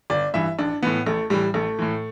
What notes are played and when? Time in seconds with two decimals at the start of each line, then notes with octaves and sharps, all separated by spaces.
0.10 G1 D5
0.34 G2 E3 E5
0.59 A1 D4
0.83 A2 E3 B3
1.06 A1 A3
1.30 A2 E3 G3
1.54 A1 A3
1.79 A2 E3